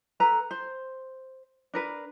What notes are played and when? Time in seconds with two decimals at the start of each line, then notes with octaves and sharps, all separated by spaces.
0.20 A4 B4 A#5
0.51 C5
1.74 D4 A#4 B4